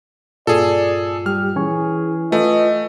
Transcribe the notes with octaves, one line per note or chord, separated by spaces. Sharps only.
G2 A#2 F4 G#4 A4 D5
G3 G4 F6
E3 C#4 G#4 G#5 C#6
A3 F4 B4 D#5 G#5